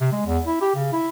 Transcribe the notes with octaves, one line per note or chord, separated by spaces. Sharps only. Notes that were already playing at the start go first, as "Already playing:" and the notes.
C3
G#3
E2
E4
G4
C#3
E4